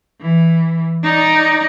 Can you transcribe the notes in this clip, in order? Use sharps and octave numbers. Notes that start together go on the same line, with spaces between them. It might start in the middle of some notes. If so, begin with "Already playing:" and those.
E3
D#4 D5